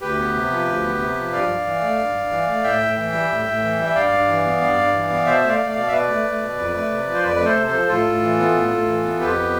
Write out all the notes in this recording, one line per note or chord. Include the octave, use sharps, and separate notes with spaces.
D2 G4 B4
B3
C3
F3
D2
B3
C3
F3
G2 D5 F5
G2
E3
A3
G2
G2
E3
A3
A2 E5 G5
A2
E3
G3
A2
A2
E3
G3
E5
G2 D5 F5
G2
E3
B3
G2
G2
E3
B3
B2 C5 E5
A3
D5 F5
A3
D5 F5
B2
E5
B2 B4 D5
A3
A3
B2
F2
A3
C3
F3
C5
F2 B4 D5
B4
A3
A4 C5
C3
A4 C5
F3
A2 F4 A4
A2
E3
B3
A2
A2
E3
B3
F2 G4 B4
B3